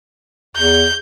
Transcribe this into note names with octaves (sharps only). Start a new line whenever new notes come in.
E2 G6